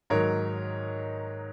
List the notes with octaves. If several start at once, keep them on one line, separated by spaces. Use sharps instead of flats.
G#2 D#3 F#3 A#4 C#5